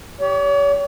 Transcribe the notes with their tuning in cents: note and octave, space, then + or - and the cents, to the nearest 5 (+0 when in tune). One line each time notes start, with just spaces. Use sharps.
G4 +0 C#5 +40